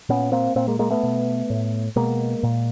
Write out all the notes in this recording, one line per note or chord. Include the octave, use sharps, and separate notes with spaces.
A#2 B3 C#4
A#3 C4
A#2 A#3 C4
G#3 A#3
G#3 A#3
A3 B3
B2
A2
B2 G#3 A#3
A#2